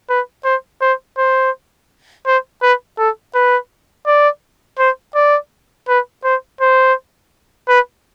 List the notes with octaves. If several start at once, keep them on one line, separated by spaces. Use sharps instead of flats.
B4
C5
C5
C5
C5
B4
A4
B4
D5
C5
D5
B4
C5
C5
B4